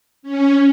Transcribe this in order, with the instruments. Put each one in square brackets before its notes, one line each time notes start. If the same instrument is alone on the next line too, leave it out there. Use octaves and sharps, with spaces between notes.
[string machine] C#4